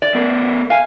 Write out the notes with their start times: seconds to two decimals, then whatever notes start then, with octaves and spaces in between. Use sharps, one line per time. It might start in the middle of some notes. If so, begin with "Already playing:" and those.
0.02 D5
0.15 B3 A4 A#4
0.70 F5 G#5